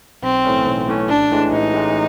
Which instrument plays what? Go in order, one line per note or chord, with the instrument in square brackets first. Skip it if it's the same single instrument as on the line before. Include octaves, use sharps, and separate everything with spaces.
[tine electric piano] B1 [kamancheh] C4
[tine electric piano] A2 E3 A3 C#4
B1
A2 E3 A3 C#4
[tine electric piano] A1 [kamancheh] D4
[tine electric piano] A2 E3 G#3
[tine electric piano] A1 [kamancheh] D#4
[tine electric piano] A2 E3 G#3